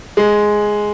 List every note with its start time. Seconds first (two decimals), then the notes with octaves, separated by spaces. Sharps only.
0.17 G#3